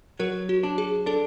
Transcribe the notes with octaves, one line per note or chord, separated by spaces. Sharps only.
F#3 A#4
F#4
D4
G#4
D4 A4